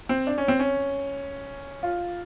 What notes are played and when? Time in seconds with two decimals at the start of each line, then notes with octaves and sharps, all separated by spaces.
0.09 C4
0.27 D4
0.38 C#4
0.48 C4
0.59 C#4
1.83 F4